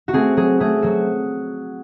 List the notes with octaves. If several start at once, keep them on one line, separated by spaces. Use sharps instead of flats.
F#4
A3 C4 G#4
F#3 G#4
A3 C4 G#4
F#3 F#4